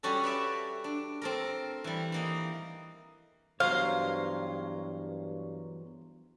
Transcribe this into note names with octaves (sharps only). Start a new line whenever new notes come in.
G3 C#4 F#4 G4 A4
B4 D5 E5
D4
C4 A4 A#4
E3 G3
E3 A#3 D#4
E2 G2 F#3 C5 C#5 F5